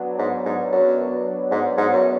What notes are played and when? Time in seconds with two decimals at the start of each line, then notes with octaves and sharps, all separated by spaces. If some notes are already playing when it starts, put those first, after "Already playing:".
Already playing: F#3 B3 D4
0.19 G#2
0.45 G#2
0.72 F#2
1.51 G#2
1.77 G#2
1.92 F#2